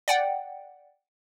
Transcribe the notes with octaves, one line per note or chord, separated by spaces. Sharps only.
D5 F#5 G5